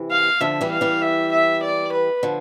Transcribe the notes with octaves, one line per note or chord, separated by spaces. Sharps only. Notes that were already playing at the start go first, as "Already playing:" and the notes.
Already playing: C3 E3
F5
D3 F3 E5
E3 G3
F5
E3 G3
E5
E5
D5
B4
D3 F3